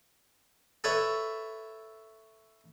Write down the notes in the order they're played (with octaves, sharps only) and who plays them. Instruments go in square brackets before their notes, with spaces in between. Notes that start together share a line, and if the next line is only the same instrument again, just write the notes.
[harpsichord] A4 B4 C#5 E5